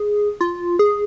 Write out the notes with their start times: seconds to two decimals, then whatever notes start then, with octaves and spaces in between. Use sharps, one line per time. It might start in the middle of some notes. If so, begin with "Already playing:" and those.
Already playing: G#4
0.41 F4
0.79 G#4